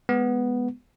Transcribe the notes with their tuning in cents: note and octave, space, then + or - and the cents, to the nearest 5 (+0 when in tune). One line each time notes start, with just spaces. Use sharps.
G#3 +0 B3 +0